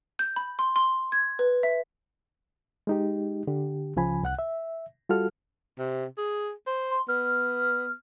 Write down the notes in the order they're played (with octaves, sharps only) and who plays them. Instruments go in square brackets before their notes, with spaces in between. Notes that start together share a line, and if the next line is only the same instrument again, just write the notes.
[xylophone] G6
B5
C6
C6
G#6
B4
E5
[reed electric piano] G#3 D#4 G4
D3 G4
C#2 C#3 F3 G#5 B5
C2 F#5 F#6
E5
G3 F4 F#4 A4 F6
[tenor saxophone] C3
G#4
C5
[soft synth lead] C6
[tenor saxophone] B3 [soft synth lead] F6